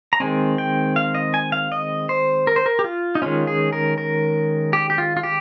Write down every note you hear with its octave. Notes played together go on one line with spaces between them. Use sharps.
A#5
D#3 G#3 C4 G#5
G5
F5
D#5
G#5
F5
D#5
C5
A#4
C5
A#4
G4
F4
D#4
D#3 G#3 C#4 F4
G#4
A#4
A#4
G4
G4
F4
F4
G4